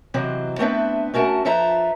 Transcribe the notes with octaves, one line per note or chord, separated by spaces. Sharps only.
C3 E3 F#3 C4 D#5
A3 B3 C4 D4 B4 E5
A3 C#4 F#4 A#4 A5
F2 F3 A4 B4 E5 A#5